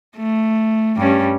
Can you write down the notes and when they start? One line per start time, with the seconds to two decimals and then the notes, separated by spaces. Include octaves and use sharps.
0.17 A3
0.97 G2 G3 C#4